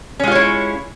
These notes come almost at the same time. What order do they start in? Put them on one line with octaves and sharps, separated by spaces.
C#4 G#3 F4 C#5 E4